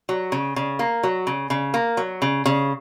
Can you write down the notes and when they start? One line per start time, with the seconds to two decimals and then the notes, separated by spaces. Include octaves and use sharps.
0.09 F#3
0.32 C#3
0.56 C#3
0.79 A#3
1.03 F#3
1.27 C#3
1.50 C#3
1.74 A#3
1.97 F#3
2.22 C#3
2.46 C#3